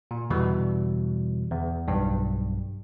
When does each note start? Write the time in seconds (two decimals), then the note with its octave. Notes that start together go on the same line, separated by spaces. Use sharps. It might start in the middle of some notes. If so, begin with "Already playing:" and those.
0.11 A#2
0.30 E2 B2 D3 E3 G3
1.51 E2
1.88 B1 G2